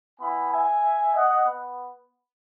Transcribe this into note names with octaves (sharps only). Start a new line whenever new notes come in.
B3 E4 G#5 B5
E5 G#5
D#5 F#5
B3